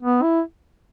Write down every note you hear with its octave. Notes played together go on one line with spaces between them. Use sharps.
B3
E4